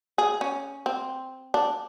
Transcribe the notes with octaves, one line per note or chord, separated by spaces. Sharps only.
G#4
C#4
C4
D4